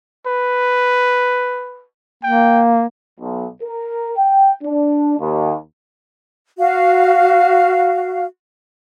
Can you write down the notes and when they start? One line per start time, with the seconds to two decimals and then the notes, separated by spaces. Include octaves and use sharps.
0.27 B4
2.24 A#3 G5
3.20 B1
3.63 A#4
4.18 G5
4.63 D4
5.19 D#2
6.58 F#4 F5